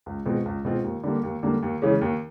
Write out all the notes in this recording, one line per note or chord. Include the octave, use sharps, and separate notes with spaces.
C#2
B2 G#3 C4 F4
C#2
B2 G#3 C4 F4
D#2
D3 G3 A#3
D#2
D3 G3 A#3
D#2
C#3 E3 G#3 C#4
D#2